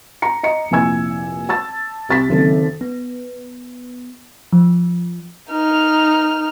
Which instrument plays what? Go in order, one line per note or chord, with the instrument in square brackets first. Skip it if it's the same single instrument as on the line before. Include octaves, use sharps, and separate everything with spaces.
[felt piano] A#5 C#7
D#5 A#5 C#7
F1 A#2 E4 G#5 E6 G#6
A5 E6 A6
C2 A6 B6
F#1 D#3 C4 A4
[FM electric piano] B3
F3
[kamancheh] D#4 F6